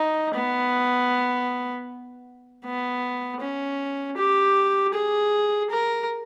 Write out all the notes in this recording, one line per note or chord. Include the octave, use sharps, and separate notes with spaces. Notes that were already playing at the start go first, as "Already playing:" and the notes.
Already playing: D#4
B3
B3
C#4
G4
G#4
A#4